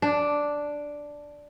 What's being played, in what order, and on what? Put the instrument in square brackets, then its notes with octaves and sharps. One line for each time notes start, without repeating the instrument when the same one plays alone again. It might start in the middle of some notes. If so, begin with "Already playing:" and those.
[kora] D4